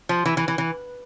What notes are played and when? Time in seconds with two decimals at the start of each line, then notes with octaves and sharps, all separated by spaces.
0.09 F3
0.26 E3
0.37 E3
0.48 E3
0.58 E3